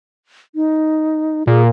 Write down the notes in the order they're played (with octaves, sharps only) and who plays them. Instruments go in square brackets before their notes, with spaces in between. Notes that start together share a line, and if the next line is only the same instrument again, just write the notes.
[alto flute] D#4
[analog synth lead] A#2 [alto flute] G#4